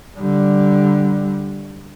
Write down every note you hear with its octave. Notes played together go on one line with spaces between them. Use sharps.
D3 G3